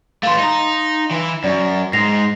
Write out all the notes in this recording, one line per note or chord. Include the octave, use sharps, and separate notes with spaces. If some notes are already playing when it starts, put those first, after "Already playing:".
E3 A3 F5 C6
D#4 A#5
E3
F#2 D5
G#2 A#6 C7 F7